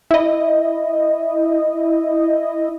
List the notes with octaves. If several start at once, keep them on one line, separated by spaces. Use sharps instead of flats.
E4 D#5